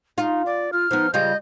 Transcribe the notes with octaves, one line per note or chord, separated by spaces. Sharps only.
D#4 F4
D5
F4 F6
F3 B3 D#4
C#3 G3 F4 D#5 G6